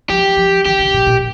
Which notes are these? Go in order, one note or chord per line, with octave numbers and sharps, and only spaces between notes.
F3 G4
F3
D#3 G4
C#3
A#2
A#2